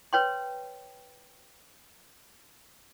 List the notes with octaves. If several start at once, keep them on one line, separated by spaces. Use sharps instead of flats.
B4 C#5 G5 C6